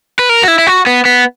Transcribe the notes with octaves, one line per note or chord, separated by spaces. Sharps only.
B4
A#4
F#4
E4
E4
F#4
B3
B3